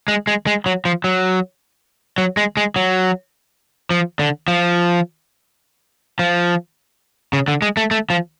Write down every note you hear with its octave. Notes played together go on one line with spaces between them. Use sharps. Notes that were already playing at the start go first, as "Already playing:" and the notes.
G#3
G#3
G#3
F#3
F3
F#3
F#3
G#3
G#3
F#3
F3
D3
F3
F3
C#3
D3
G#3
A3
A3
F3